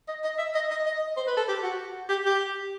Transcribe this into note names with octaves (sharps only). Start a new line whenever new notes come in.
D#5
D#5
E5
D#5
D#5
D#5
C5
B4
A4
G4
F#4
G4
G4